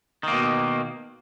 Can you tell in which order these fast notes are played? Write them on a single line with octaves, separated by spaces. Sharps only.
D#3 A#3 B2